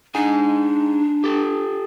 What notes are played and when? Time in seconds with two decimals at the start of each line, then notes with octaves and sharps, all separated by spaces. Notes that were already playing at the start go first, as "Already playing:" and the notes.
0.15 D4 D#4 G#4 G#5
1.24 G4 A4